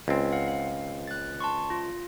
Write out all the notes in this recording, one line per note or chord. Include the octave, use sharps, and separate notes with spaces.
C#2 C4
F5 F#5
F5
F#6 A6
A5 C6 C#6
F4